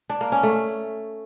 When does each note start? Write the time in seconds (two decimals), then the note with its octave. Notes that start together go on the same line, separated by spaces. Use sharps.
0.10 D4
0.21 A#3
0.32 C#4
0.43 A3